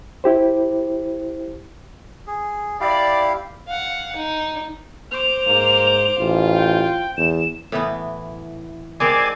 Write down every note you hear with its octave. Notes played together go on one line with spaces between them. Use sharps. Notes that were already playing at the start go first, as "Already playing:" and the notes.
E4 G4 C5
G#4
E4 G4 D5 F5
F5 F#5
D#4
C5 D6 F7
G#2 A#3
A1 F4
G5
E2 E7
A2 E3 B3
D#3 G#3 C4 D5 G#5